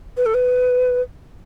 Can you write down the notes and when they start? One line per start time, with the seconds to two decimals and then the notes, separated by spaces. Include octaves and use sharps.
0.17 B4
0.26 A4
0.34 B4